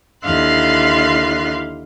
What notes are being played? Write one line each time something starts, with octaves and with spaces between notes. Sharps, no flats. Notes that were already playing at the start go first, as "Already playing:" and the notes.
D#2 D3 E4 F5 C6 F#6